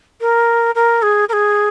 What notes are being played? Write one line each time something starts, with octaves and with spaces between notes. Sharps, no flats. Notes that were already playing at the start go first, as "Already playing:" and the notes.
A#4
A#4
G#4
A#4
G#4